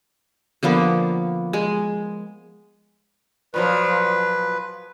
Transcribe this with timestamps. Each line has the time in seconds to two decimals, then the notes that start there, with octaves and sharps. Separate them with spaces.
0.63 D3 F3 A#3 B3
1.53 G#3
3.54 A#2 F3 F#3 B4